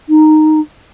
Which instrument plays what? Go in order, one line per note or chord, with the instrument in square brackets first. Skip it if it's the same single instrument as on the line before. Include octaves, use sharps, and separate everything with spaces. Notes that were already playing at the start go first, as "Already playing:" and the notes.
[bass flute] D#4